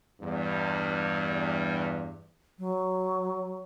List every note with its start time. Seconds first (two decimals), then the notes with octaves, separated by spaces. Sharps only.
0.20 E2 G2
2.59 F#3